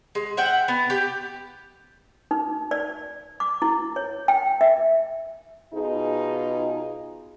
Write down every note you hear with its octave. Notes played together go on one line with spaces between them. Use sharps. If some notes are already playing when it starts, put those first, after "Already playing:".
G#3
E5 F#5 G5
B3
G4
D#4
D5
D6
E4
C#5
G5
E5
B2 D#4 F4 G#4